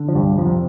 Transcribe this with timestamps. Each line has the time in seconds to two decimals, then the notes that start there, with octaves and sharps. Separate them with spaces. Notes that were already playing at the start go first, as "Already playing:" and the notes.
Already playing: D3
0.09 F3
0.15 C2 G2 G3
0.38 F2 F3
0.46 C3